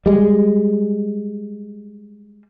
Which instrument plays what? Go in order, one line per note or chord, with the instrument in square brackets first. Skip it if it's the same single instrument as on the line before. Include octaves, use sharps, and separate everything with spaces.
[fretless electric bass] G3 G#3